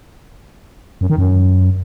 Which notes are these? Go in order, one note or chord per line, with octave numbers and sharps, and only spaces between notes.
F#2
D#3
F#2